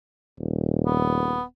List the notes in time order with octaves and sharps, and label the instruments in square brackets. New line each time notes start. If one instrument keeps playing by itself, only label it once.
[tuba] D#1
[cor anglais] B3